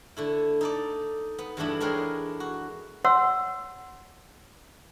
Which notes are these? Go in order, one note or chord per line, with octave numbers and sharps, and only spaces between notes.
D3 A3 E4
D#4 A4 D5
B3
E2 G2 E3 A3 D4 E4
G#3 D4 G#4 A#4 C#5 G5
F#4
C#5 F#5 C6 E6